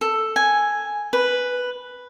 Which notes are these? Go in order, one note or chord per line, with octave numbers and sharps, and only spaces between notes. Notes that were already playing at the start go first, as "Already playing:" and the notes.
A4
G#5
B4